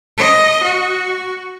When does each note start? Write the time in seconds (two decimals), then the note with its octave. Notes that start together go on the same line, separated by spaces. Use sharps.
0.17 D#5
0.63 F#4